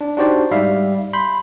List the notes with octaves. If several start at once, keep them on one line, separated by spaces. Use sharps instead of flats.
D4
D4 D#4 F#4 G4 C5 D5
G#2 G3 E5 F5
B5 C6 G6